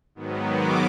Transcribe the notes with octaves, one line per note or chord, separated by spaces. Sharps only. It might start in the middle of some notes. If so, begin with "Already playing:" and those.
G#2 D#3 F#3 B3
D6